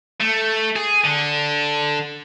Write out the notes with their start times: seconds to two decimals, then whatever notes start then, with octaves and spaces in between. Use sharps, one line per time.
0.21 A3
0.76 G#4
1.04 D3